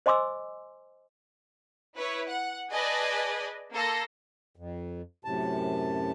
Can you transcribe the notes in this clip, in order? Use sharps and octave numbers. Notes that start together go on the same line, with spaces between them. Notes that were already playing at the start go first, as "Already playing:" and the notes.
C5 D#5 G#5 C6 D6 E6
E4 B4 C#5
F#5
G#4 B4 D5 D#5 G#5 A5
A#3 A4 C6 A#6
F2
F#2 A2 C3 A5